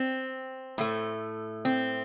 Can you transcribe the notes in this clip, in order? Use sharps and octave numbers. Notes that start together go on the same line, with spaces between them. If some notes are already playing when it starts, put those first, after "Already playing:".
Already playing: C4
A2 A3
C4